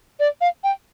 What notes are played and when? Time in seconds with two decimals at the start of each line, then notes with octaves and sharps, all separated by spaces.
0.20 D5
0.41 F5
0.64 G5